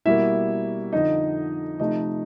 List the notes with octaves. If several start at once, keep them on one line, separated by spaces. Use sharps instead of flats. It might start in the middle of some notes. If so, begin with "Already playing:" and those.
B2 G3 A#3 E4 E5
F2 D3 F3 D#4 D#5
C3 F3 A3 D#4 D#5